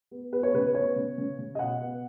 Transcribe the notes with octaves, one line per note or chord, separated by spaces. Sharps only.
B3
B3 B4
C#5
C#3 B4
B3 C#5
C#3
C#3
C#3
D#5
B2 F#5
B3